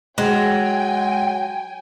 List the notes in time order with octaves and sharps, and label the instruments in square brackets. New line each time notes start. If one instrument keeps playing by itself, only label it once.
[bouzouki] F#3 [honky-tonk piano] G#3 [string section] G5 G#5